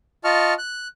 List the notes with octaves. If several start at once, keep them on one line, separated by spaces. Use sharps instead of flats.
F4 D#5 A5 C#6 F6
F#6